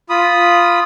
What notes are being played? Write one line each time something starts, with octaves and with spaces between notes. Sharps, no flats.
F4 B5 D#6